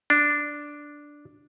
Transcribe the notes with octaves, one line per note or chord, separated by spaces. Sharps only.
D4